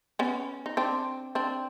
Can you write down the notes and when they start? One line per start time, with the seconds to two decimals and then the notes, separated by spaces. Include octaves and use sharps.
0.19 B3 C#4
0.66 D#4
0.77 C4 D4
1.35 C4 D4